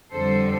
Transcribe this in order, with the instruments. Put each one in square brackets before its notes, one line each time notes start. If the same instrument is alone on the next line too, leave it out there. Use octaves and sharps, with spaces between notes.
[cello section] F2 D3 G3 A4 C5